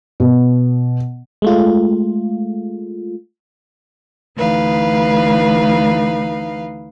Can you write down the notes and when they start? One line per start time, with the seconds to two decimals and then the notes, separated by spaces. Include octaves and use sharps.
0.20 B2
1.42 G#3 A3 F4
4.36 D2 E3 D#4 B4 F5